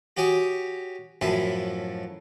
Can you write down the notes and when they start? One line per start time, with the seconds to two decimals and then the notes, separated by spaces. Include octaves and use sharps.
0.17 F#4 G4 C#5 G#5 D#6
1.22 F#2 A2 F3 E4 B4